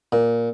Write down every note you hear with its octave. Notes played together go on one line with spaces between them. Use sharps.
A#2